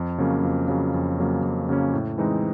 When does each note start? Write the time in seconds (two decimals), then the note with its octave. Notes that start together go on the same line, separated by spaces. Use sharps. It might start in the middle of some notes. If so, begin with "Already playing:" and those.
Already playing: F2
0.18 C#3 F#3 A#3 C#4
0.43 F2
0.68 C#3 F#3 A#3 C#4
0.94 F2
1.18 C#3 F#3 A#3 C#4
1.43 F2
1.69 C#3 F#3 A#3 C#4
1.93 A2
2.18 E3 G#3 C4 D#4